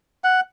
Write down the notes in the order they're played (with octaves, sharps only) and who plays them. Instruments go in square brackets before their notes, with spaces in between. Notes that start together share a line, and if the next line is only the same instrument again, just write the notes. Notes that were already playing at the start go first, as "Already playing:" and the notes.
[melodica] F#5